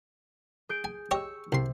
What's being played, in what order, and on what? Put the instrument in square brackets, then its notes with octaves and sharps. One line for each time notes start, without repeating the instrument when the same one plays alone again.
[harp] G#4 G6 D7
[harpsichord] G#5
[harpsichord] G4 C#5 D#5 [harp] C#6 E6
[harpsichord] C2 C6 [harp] C3